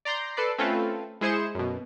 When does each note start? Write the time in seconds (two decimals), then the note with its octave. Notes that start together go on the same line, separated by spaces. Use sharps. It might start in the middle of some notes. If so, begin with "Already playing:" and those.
0.05 D5 A#5 C6 G6 A#6
0.37 A4 B4 D5 C7
0.58 A3 C4 C#4 F4 A4 B4
1.21 G#3 E4 G#4 C5 C#7 E7
1.55 F#2 B2